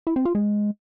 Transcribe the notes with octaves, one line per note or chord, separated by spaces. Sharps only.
E4
C4
F4
G#3